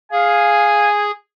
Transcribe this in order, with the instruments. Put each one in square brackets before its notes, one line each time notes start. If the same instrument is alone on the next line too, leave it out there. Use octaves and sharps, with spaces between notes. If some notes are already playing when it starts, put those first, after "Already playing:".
[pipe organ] G#4 [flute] F5 [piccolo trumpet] G#5